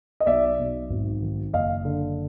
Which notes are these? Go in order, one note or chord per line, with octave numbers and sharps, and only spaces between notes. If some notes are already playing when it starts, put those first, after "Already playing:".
D#5
B1 D5 E5
B1
G#1
D#3
F#1 D#5 F5
D3